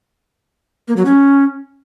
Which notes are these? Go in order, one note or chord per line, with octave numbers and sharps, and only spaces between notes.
A#3
F#3
C#4